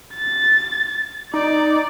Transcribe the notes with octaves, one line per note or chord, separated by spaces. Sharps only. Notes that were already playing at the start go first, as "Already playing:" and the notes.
A6
D#4 D5